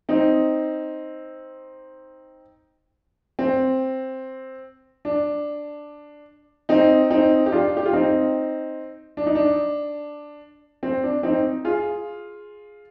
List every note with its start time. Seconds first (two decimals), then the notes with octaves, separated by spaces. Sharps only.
0.09 C4 D#4
3.39 C4
5.05 D4
6.69 C4 D#4
7.10 C4 D#4
7.46 G4
7.52 D4 F4
7.77 G4
7.86 F4
7.93 C4 D#4
9.17 D4
9.26 D#4
9.35 D4
10.83 C4
11.03 D4
11.23 C4 D#4
11.65 F4 G#4